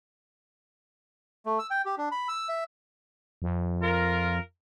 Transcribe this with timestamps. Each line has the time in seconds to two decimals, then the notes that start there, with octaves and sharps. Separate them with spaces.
1.46 A3
1.59 E6
1.70 G5
1.85 G4
1.98 D4
2.12 B5
2.28 E6
2.49 E5
3.42 F2
3.81 F4 A#4